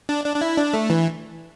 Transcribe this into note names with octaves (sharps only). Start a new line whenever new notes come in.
D4
D4
D4
E4
D4
A3
E3